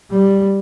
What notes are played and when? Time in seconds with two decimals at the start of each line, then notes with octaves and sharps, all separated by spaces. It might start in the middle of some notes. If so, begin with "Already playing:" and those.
0.11 G3